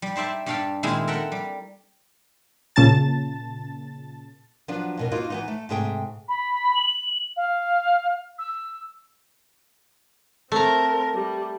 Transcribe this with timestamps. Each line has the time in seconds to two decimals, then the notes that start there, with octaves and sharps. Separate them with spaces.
0.02 G3
0.16 D#4 C5 D5 E5 A5
0.46 G2 G3 D4 A4 F5 G5
0.83 A#2 D#3 G#3 C4 E4 G#4
1.07 A4 A#4 E5 F#5 G5
1.32 G3
2.76 A#2 C#3 A5 A6
4.68 F3 F#3 B3 D4
4.97 F2 B2 A#4
5.11 A#3 B3 D#4 F4 F#4
5.30 E3 B3 D#4
5.48 A3
5.69 G#2 C3 A3 G#4 G5
6.28 B5
6.74 F#7
7.36 F5
8.38 E6
10.52 A3 C4 A#4 A#5
11.14 G3